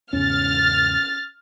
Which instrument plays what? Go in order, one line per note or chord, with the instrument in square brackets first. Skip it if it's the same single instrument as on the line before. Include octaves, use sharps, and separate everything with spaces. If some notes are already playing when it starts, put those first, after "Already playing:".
[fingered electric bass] E2 G#2 C#3 [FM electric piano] C#4 [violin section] F6 A6